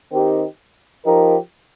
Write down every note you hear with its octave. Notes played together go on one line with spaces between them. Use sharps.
D#3 C4 D#4 G4
F3 D#4 G4 A#4